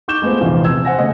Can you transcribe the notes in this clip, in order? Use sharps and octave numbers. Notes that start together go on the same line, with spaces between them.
D#4 C#6 D6 G6 E7 G7
G#3 A3 B3 C4 F4
A#1 E2 C3 E3 F3
E6 G#6
C5 F#5 G#5 A#6
C#3 A3 D#5